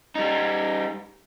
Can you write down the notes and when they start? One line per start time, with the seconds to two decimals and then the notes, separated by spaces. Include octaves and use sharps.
0.15 G3 D#4